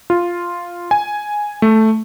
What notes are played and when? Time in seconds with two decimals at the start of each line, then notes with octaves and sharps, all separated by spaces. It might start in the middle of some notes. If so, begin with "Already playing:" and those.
0.10 F4
0.91 G#5
1.62 A3